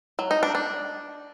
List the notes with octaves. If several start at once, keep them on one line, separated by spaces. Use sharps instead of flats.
F#3
D#4
D4
D4